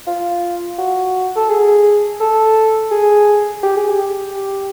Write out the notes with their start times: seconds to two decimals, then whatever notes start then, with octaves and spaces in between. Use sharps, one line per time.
0.07 F4
0.78 F#4
1.36 A4
1.49 G#4
2.20 A4
2.91 G#4
3.63 G4
3.77 G#4
3.91 G4